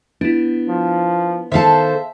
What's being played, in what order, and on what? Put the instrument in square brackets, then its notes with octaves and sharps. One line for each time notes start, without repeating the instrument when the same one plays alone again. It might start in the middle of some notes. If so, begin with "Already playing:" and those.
[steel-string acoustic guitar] B3 [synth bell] D4 E4
[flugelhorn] F3
[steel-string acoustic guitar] D#3 A4 [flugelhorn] C5 [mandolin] E5 F5 A5